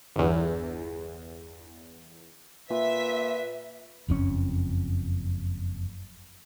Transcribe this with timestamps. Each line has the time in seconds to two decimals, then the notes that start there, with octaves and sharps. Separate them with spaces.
0.16 G1 E2
2.70 A#2 B4 E5 B6
4.09 F#1 F2 C#4